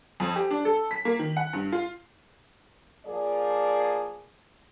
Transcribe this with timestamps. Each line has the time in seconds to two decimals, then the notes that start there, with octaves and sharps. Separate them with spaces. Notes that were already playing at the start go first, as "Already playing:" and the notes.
0.20 F2
0.36 G4
0.51 D4
0.65 A4
0.91 B6
1.05 A#3
1.19 D#3
1.37 F#5
1.53 G2
1.72 F4
3.05 F3 A#3 G#4 D5